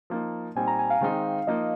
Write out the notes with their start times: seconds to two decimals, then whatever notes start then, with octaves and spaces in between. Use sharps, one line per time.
0.10 F3 A#3 D#4
0.55 A#2 G3 C4 D#4 G#5
0.67 A#5
0.79 G#5
0.90 F5
1.01 D#3 G#3 C4 D#4
1.47 F3 A#3 D#4 D#5